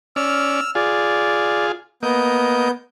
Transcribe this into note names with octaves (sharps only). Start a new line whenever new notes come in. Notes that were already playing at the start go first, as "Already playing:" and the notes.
C#4 D5 E6 F6
F4 G#4 D5
A#3 B3 D#5 G6